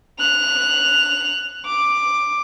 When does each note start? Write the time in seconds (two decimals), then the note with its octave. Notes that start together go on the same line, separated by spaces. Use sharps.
0.19 F#6 F7
1.66 D6